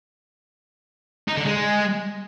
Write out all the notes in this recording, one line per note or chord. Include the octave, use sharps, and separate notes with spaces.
D#4
D3
G#3